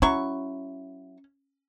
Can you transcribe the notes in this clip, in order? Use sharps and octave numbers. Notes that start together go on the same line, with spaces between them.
F#3 C#4 E4 C#6